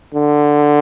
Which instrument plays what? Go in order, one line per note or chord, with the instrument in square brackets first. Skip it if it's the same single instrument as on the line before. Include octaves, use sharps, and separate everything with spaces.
[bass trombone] D3